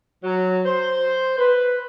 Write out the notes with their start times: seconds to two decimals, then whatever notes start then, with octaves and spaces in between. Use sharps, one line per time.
0.24 F#3
0.66 C5
1.39 B4